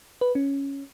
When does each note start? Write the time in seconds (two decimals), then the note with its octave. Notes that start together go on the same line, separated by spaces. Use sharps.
0.21 B4
0.35 C#4